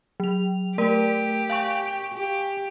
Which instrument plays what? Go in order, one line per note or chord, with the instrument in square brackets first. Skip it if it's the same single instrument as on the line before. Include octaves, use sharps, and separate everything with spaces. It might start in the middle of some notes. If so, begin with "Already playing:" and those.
[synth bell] F#3 F7
[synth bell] A3 A#4 D5 [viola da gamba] G4
[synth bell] F5 G#5 C#6
[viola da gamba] G4